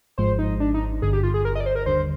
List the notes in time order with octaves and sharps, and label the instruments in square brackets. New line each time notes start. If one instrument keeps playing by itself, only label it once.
[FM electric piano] G#1 G#2 F3 G#3 [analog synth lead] C5
[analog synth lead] D#4
D4
D#4
[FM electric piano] G1 G2 D3 [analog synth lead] G#4
[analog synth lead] G4
F4
G#4
A#4
D#5
D5
C5
A#4
[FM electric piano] D#2 D3 G3 [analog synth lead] C5